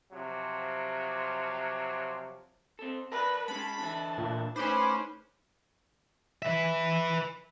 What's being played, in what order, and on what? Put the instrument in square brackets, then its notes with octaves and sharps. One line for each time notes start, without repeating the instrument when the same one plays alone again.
[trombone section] C3 F3 F#3
[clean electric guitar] C4 A4
[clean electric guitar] A#4 D5 A5 [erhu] B4
[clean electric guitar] G#3 C#4 G#4 [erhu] A5 [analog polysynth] B5
[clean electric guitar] D3 E3 E4
[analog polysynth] A#2
[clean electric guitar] A2 D#4 [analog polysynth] C#4 C5 [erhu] B4 [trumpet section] B5 D6
[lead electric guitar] B4 E5